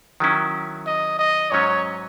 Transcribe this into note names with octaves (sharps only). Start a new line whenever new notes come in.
D#3 F#3 C#4 E4
D#5
D#5
G#2 F#3 C#4 C#5